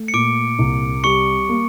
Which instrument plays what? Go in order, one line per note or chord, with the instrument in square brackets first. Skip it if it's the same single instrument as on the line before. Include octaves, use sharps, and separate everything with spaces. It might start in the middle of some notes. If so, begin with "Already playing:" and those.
Already playing: [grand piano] A3
[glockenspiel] C#7
[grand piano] A#2 [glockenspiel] D6 D7
[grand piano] C2
[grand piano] G3 [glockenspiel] C#6 C#7
[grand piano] A#3